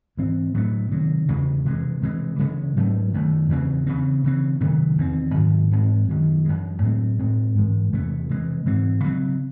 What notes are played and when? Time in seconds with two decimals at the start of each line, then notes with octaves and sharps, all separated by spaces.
0.17 G#2 E3 C4
0.54 A2 F#3 A3
0.91 C3 D#3 F#3
1.28 E2 C#3 G#3
1.65 C3 E3 G#3
2.02 C3 E3 G#3
2.39 C#3 E3 G#3 C#4
2.77 G#2 F#3 A3
3.14 F#2 D#3 A3
3.49 E2 C#3 E3 C4
3.87 C#3 E3 C4
4.24 C#3 E3 C4
4.61 C3 D#3 F#3 A3
4.98 E2 D#3 A3 C4
5.34 G#2 D#3 F#3
5.71 G#2 E3 G#3 C4
6.09 F#2 D#3 F#3
6.45 F#2 E3 G#3
6.82 A2 F#3 A3 C4
7.19 A2 G#3 C4
7.56 G#2 E3 G#3
7.92 E2 C3 E3 A3
8.29 C3 E3 G#3
8.66 G#2 E3 C4
9.04 C#3 F#3 C4